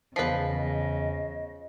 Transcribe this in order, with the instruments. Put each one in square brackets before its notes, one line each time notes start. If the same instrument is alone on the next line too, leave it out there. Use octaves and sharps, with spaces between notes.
[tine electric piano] E2 B6 C7 [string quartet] C#3 [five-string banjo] F3 B4 [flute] D#5